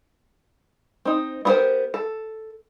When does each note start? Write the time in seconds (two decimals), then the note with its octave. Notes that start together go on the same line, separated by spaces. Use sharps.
1.05 C4 D#4
1.45 B3 F#4 G4 A#4 C5
1.94 A4